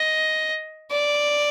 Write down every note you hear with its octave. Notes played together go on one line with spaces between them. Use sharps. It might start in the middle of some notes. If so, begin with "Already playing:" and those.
Already playing: D#5
D5